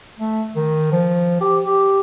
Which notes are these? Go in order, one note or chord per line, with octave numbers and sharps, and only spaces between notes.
A3
D#3
F3
G4
G4